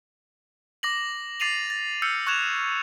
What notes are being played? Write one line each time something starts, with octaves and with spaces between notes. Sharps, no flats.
D6 A#6 F#7
D6 A6 C7 D#7 F7 F#7
A6
E6 F6 G6 C#7
C#6 F#6 G#6 E7 F7